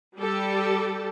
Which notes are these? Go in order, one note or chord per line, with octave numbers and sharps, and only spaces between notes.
G3 G4 A4